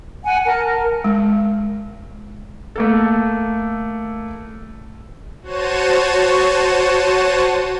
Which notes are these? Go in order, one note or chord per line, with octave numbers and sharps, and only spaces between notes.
F#5 G#5
A#4 A5
A#4
G#3
A3 A#3 A4
F#4 C5 C#5 A5 D#7